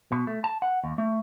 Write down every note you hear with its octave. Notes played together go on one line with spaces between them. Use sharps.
B2
A3
A5
F#5
D#2
A3